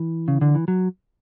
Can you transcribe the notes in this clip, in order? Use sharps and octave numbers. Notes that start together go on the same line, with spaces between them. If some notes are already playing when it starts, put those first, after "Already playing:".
Already playing: E3
C#3
D3
E3
F#3